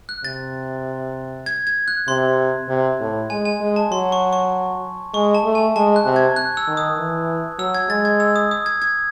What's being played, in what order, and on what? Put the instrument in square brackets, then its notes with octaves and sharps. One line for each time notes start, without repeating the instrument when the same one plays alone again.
[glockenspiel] F#6
[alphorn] C3 [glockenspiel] A6
[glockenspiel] G#6
G#6
F#6
[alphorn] C3 [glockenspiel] C6
[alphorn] C3
A2
[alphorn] G#3 [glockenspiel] G#5
[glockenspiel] G#5
[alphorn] G#3
[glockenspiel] A5
[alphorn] F#3 [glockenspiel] C6
[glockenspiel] C#6
C#6
[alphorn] G#3 [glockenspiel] C#6
[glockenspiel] A5
[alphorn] A3
[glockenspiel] G#5
[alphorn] G#3 [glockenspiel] A5
[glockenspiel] F#6
[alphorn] C3
[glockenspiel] G#6
F#6
E6
[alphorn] D#3
[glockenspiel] D#6
[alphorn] E3
[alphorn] F#3 [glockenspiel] E6
[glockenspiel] G#6
[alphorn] G#3 [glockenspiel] A6
[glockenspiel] G#6
E6
D#6
D#6
G#6
G#6